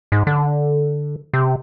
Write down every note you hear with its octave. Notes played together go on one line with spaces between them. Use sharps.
G#2
D3
C3